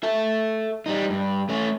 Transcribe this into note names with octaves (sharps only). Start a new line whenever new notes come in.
A4 E5
G3 D#4
G2
A3 C#4